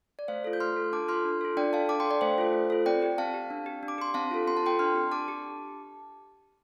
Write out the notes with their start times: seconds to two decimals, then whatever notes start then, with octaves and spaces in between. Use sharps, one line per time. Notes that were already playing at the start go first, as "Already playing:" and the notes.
0.19 D5
0.28 A3 C5 F5
0.44 F4 A4
0.53 G6
0.60 A3 C6 F6
0.76 F4 A4
0.92 D4 A5 D6
1.08 F4 A4 C6 F6
1.25 D4
1.41 F4 A4
1.57 D4 D5 G5
1.73 A4 F5 A5
1.89 D4 A5 D6
2.00 G5 C6
2.05 A4
2.10 D5 G5
2.21 A3 C5 F5
2.38 F4 A4
2.53 A3
2.70 F4 A4
2.86 C4 D5 G5
3.02 G4
3.18 C4 F5 A5
3.34 G4
3.50 D4
3.66 G4
3.83 D4
3.88 D6
3.98 G4 C6
4.14 C4 F5 A5
4.31 F4 A4
4.47 C4 C6
4.57 A5
4.63 F4 A4 G5 C6
4.79 D4 C6 F6
4.96 G4
5.12 D4 A5 D6
5.28 G4